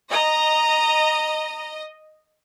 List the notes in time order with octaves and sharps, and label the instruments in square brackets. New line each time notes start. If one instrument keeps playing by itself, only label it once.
[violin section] D#5 [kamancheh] A#5